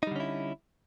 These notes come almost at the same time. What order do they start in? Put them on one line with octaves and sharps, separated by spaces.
D#4 G3 D3 C#4 E4